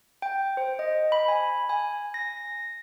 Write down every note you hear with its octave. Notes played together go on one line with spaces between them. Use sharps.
G5
C5
D#5
B5
G#5
G#5
A#6